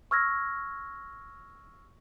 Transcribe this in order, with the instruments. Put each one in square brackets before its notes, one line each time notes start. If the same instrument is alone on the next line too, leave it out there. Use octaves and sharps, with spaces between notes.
[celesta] C#6 E6 F6 G#6 A#6